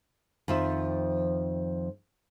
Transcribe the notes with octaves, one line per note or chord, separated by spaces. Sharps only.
F2 D#3 F3 E5